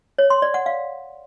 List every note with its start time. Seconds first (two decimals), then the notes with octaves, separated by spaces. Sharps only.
0.18 C#5
0.30 C6
0.42 D5
0.54 F#5
0.66 F5